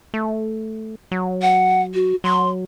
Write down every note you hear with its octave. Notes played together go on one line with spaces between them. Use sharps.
A3
F#3
F#5
F#4
F#3 C6